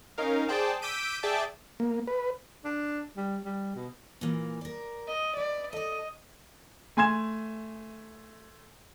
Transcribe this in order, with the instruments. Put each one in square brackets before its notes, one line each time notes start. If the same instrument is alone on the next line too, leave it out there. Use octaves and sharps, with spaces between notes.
[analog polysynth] C#4 D#4 A#4 F5
G#4 C5 D5 G5 A5
D6 E6 G6 B6 D7 D#7
G#4 D5 E5 G5 A5 D6
[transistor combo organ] A#3
B4
[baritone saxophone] D4
G3
G3
B2
[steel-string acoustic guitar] A#2 E3 A#3
A#4 D5
[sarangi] D#5
[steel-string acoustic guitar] B4 [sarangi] D5
[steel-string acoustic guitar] A4 D5 [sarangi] D#5
[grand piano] A3 G#5 C6 G#6 E7